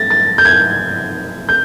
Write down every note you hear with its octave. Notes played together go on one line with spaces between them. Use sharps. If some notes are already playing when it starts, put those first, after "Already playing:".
Already playing: A6 A#6
A6
G6
G#6
G6